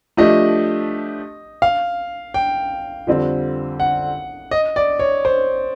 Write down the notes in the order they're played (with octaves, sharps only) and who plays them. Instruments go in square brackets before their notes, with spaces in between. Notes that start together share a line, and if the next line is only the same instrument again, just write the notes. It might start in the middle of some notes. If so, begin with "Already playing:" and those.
[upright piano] F3 A3 D4 G4 [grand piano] D#5
[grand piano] F5
G5
[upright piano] F2 D3 G3 C4
[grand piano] F#5
D#5
D5
C#5
C5